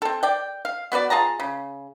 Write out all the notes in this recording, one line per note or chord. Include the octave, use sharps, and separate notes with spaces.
C4 A4
D5 G5
F5
B3 F#4 B4 D5
F4 G#4 A5 A#5
C#3